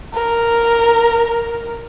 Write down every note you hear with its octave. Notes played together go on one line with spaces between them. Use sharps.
A#4